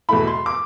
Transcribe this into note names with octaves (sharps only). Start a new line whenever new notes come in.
E2 B2 A3 E4 B5
C6
D6